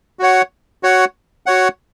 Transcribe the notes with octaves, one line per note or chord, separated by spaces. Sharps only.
F#4 C#5 F#5
F#4 C#5 F#5
F#4 C#5 F#5